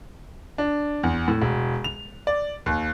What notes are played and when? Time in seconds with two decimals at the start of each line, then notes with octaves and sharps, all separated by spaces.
0.58 D4
1.03 E2
1.28 A2
1.41 E1
1.84 F7
2.27 D5
2.66 D#2